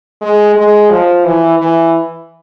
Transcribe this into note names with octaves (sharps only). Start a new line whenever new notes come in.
G#3
G#3
F3
E3
E3